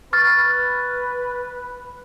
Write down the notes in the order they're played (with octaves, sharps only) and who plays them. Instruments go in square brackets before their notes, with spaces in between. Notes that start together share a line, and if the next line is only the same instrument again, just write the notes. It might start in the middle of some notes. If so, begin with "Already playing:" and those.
[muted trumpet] B4 [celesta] C#6 F6 A6